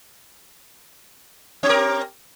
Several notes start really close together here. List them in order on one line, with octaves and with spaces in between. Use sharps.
C4 G4 A#4